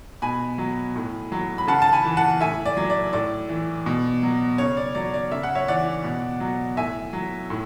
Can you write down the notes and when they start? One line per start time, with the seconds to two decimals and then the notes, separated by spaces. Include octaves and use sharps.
0.22 B2 G#5 B5
0.58 F#3
0.95 A2
1.32 F#3
1.58 B5
1.67 C#3 F#5 A5
1.82 A5
1.92 G#5 B5
2.05 E3
2.17 F#5 A5
2.41 A2 E5 G#5
2.66 D5
2.77 F#3
2.90 D5
3.13 A2 D5
3.49 E3
3.86 B2
4.23 F#3
4.58 C#3 C#5
4.77 D5
4.95 F#3 D5
5.14 D5
5.31 C#3 E5
5.43 F#5
5.55 C#5 E5
5.68 E3 D5 F#5
6.04 B2
6.40 F#3
6.77 A2 E5 G#5
7.13 F#3
7.50 A2